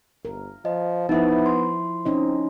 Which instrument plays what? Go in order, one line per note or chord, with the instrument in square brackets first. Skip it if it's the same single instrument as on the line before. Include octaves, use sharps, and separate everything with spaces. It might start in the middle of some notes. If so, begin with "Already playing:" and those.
[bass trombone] G1 [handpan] A#4
[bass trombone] F3 [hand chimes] D#5
[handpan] F3 E4 C5 [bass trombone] B3 [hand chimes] D#4 E5
[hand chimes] C6
[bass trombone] C4 [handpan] C#4 D#4 D#5